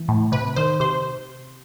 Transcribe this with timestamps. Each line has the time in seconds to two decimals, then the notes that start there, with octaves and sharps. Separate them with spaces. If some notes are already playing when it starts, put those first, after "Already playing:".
Already playing: E3
0.08 A2
0.32 C3 B4
0.56 D#3 C5
0.80 C3 C5